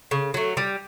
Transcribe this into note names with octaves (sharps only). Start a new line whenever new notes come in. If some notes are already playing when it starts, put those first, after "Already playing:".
C#3
F#3 A3
G3